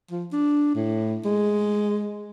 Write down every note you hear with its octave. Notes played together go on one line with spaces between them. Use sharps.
F3
D4
A2
G#3